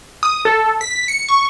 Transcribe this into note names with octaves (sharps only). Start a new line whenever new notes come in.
D#6
A4
B6
C#7
C#6